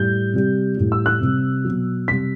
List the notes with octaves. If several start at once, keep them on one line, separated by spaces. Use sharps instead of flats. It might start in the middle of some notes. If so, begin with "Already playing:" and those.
Already playing: A2 G3 G6
C3 G3
A2 G3
E6
F#6
C3 G3
B2 F#3
C3 G3 B6